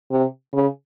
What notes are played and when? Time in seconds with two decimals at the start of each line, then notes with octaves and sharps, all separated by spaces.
0.11 C3
0.53 C#3